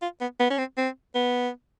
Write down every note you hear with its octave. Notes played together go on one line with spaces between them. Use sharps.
F4
B3
B3
C#4
C4
C4
B3